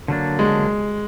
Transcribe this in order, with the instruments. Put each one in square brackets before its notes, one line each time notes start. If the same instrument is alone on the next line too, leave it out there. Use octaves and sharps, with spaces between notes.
[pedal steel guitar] D3 F#3 A#3 D4
[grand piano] G#3